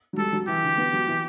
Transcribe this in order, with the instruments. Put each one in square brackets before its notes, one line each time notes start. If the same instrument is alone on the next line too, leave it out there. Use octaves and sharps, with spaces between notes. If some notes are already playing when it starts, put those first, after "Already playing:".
[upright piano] F#3
[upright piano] G3 [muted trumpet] A4
[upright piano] F#3
[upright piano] E3 [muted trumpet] G4
[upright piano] D3
B3
F#3
E3